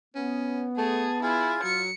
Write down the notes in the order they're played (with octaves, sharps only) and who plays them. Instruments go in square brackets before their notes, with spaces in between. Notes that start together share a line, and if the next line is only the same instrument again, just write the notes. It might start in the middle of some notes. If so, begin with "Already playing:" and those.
[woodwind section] B3 [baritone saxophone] C#4
[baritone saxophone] A3 [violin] G#4 [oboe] A5
[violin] E4 [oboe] F4 [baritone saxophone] G#4
[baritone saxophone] F#3 [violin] C#7